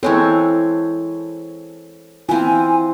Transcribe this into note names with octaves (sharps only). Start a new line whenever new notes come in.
E3 G#3 C4 A4 C#5
E3 C4 F4 G#5